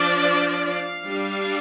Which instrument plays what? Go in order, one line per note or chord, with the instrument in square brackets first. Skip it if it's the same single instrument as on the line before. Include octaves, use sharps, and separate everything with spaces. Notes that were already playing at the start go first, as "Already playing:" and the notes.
Already playing: [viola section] F3 D4 D5
F5
G3 D4